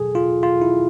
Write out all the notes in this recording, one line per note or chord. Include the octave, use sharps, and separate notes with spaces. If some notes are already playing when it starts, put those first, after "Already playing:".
Already playing: B2 F#3 G#4 A4
F4
F4
E4